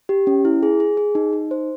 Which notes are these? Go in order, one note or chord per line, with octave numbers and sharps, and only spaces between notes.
G4
C#4
E4
G#4
G#4
G#4
D#4
D#4
C5